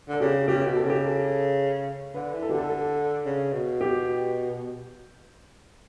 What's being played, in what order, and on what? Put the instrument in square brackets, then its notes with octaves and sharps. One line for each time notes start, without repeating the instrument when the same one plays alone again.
[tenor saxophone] D3 [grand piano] A4
[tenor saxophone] C#3 [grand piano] G4
[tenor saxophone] C#3 [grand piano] G4
[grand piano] G4
[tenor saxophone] B2
[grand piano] A4
[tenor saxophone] C#3 [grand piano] G4
[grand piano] A4
[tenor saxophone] D3 [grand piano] B4
[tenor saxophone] E3
[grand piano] A4
[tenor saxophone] D3 [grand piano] G4
[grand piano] A4
A4
[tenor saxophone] C#3
B2
[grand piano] G4